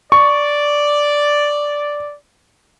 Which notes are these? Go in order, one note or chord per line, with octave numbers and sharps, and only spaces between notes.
D5 C#6